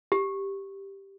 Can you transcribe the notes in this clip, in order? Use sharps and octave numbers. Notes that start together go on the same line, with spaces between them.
G4